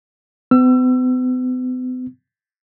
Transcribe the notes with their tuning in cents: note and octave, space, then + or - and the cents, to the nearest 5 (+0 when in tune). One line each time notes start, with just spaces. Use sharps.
B3 +45 E6 +30